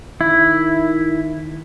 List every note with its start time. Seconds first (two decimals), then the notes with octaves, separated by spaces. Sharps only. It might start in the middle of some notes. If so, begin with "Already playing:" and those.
0.21 D#3 E4